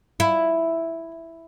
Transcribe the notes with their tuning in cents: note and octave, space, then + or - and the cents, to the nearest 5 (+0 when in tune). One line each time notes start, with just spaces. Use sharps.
E4 +0